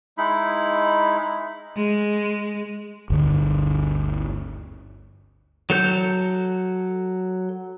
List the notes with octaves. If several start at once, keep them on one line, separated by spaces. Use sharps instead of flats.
G#3 D#4 E4 B5
G#3
G1 D2
F#3 A4 G6